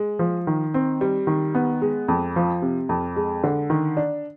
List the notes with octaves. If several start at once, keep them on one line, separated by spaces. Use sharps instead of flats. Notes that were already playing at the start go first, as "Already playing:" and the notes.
Already playing: G#3
F3
D#3
C4
G3
D#3
B3
G#3
F2
F3
C3
F2
G#3
D3
D#3
D4